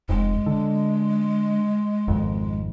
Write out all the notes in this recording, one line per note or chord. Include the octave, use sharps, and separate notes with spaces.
F1 G#3
D3
G#1 F2